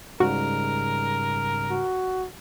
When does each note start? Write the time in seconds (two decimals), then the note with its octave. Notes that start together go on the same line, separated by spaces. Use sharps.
0.20 G#2 C#3 G3 F#4 A#4
1.71 F#4